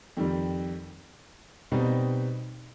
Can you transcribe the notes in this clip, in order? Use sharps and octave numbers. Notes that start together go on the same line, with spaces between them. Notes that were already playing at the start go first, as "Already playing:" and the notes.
F2 D#3 G3
B2 G3 C4 D#4